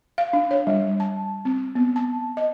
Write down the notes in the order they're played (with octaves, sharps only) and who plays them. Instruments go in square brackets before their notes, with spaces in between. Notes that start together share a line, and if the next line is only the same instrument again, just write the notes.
[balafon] F5
D4
C#5
G3
A5
C4
B3
A5
D#5